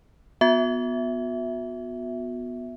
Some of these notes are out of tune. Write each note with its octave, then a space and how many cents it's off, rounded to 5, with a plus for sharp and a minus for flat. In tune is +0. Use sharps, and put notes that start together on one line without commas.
B3 +0 F#4 -40 E5 +0